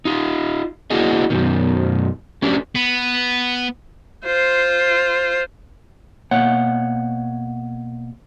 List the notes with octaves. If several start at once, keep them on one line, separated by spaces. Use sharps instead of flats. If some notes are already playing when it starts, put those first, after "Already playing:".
D#4 F4
A#3 D4 E4 F#4 G#4 D#5
F#2 B2 D#3
A3 C#4 D4 G4 B4
B3
F4 C5
B2 A#3 C#5 E5 F#5